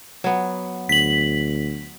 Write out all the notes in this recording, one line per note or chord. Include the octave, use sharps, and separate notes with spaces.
F#3 B3
D2 B6 F#7